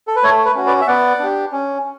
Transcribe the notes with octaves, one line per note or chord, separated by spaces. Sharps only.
A4
B4
A3 A4 C#5
B4
C#4 F#4
B4 D5
E5
B3 D5 F#5
D4 G4
C#4